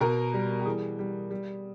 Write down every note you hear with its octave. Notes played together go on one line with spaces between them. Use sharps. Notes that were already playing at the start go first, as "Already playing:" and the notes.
B2 A#4
G3
G4
E3 G#4
G3
G3